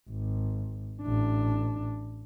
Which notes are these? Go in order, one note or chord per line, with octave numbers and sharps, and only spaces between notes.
G#1
A1 D4